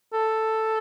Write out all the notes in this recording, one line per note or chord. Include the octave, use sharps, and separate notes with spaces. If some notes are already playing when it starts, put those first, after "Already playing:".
A4